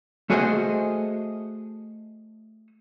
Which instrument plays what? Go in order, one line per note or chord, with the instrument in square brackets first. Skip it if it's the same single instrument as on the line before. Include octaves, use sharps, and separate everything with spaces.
[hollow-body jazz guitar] A3 F#4 G#4 A4 C5 D#5